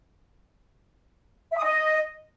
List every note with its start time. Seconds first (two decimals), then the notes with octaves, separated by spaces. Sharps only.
1.51 E5
1.58 D#6
1.65 D#5